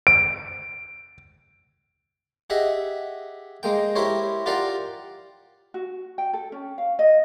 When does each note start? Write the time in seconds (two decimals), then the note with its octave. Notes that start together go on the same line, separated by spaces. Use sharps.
0.07 D7
2.50 G4 G#4 D#5 E5 F#5
3.63 G#3 A#3 G5
3.95 E4 G4 A#4 C5 C#5
4.46 F4 G4 A#4 D5 F5 F#5
5.74 F#4
6.18 G5
6.33 A4
6.52 C#4
6.78 F5
6.99 D#5